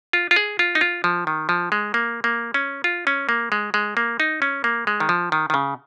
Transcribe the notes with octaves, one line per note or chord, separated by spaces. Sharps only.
F4
F4
G#4
F4
D#4
F4
F3
D#3
F3
G#3
A#3
A#3
C#4
F4
C#4
A#3
G#3
G#3
A#3
D#4
C#4
A#3
G#3
D#3
F3
D#3
D#3
C#3